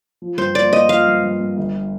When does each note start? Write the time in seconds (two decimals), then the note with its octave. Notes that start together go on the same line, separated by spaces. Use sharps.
0.22 F3
0.38 G2 C5
0.55 A#3 D5
0.72 A#3 D#5
0.89 F3 F5
1.07 G2
1.24 G2
1.40 G2
1.57 G1